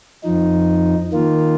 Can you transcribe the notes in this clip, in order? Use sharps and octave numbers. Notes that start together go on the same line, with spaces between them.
F2 F3 D#4
D#3 A#3 F4